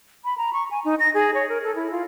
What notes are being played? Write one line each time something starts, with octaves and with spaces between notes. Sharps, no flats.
B5
A#5
C#6
G#5
D#4
A#6
G#4
C#5
A#4
A4
E4
F4